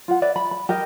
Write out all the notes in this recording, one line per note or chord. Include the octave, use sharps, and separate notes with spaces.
F4 F#5
B4 D5 E5
B5
B5
G4 A#4 D#5